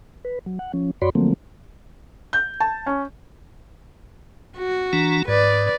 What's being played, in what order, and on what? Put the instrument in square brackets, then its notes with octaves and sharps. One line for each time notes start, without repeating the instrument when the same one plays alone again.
[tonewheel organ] B4
F#3
F#5
F3 C#4
F#2 F#4 C#5 D5 B5 C6
D3 F3 F#3 A3 A#3 C4
[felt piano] G6
A5
C#4
[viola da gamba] F#4
[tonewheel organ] E3 D4 A#5
[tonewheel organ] G#2 [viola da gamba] B4 D5